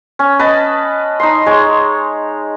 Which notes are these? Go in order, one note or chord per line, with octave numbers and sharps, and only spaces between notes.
C#4
B4 D#5 A5
D#4 C6
G#3 C#5